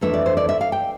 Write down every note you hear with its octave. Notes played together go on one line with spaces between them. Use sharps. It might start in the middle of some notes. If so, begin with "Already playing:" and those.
F2 E3 A3 D4 E5
D5
C5
D5
E5
F5
G5